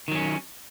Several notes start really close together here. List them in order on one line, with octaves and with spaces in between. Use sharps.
D#3 F#3 C#4